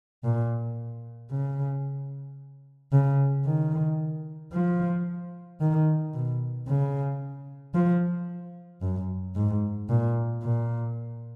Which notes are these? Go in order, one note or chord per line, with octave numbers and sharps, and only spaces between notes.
A#2
C#3
C#3
D#3
F3
D#3
B2
C#3
F3
F#2
G#2
A#2
A#2